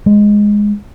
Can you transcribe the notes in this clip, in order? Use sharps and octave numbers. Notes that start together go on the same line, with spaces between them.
G#3